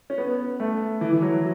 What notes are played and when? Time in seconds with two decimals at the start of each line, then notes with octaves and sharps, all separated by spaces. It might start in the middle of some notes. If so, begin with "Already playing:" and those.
0.10 C#4
0.18 B3
0.60 A3
1.01 E3
1.12 E3
1.22 F#3